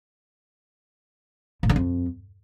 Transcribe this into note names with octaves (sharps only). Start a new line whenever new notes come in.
A2
D3
F2